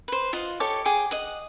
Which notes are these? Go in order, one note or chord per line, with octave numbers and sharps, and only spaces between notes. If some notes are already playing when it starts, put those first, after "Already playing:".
B4 C5
F4 D#5 F#5
G4 A4 C#5 D6
G#4 G5 D6
D#5 F#5